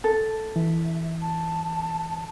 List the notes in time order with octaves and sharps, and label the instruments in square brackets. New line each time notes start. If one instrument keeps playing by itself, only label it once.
[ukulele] A4
[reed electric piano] E3 [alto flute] E5
[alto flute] A5